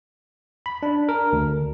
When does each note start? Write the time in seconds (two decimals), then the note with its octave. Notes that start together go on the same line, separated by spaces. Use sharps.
0.66 B5
0.83 D4
1.09 A#4
1.33 D2